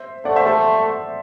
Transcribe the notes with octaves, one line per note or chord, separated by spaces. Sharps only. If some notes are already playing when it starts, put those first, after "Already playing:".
Already playing: C5 E5
A3 D5 F#5
C5 E5
A4 C5